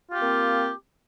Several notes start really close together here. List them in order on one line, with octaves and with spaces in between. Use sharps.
F4 G4 C4 A#3